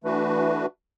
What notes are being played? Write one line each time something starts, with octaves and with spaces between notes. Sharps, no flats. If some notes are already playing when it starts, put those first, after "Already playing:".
E3 A3 D4 F#4 B4